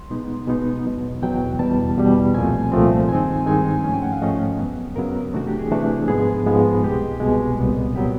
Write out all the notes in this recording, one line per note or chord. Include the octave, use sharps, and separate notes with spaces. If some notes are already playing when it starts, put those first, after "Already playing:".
Already playing: C6
B2 G#3 B3 D#4
B2 G#3 B3 D#4
E2 B2 F#3
E2 B2 F#3 G5
E2 B2 G3 A5
E2 B2 G3
C2 A#2 F3 A3 C4 G#5
C2 A#2 F3 A3 C4
G2 D#3 G#3 C4 D#4 G#5
G2 D#3 G#3 C4 D#4 G#5
G#2 F3 A3 C#4 G#5
G5
F#5
F5
G#2 F3 A3 C#4 D#5
F#2 C#3 F#3 B3
F#2 C#3 F#3 B3 A#4
C3 E3 A3 D4 F#4
G4
G#4
C3 E3 A3 D4 A4
G#2 F3 G#3 B3 G#4
G#2 F3 G#3 B3
C2 B2 G#3 G4
C2 B2 G#3
C2 A#2 F#3 B3
A#2 F#3 B3 G4